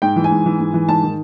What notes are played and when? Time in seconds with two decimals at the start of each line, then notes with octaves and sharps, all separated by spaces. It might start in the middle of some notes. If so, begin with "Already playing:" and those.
0.02 G#2 G5
0.16 E3
0.24 G#5
0.31 G#2
0.46 E3
0.60 G#2
0.74 E3
0.88 G#2 A5
1.03 D#3